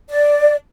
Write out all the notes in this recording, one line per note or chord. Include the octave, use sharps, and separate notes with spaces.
D5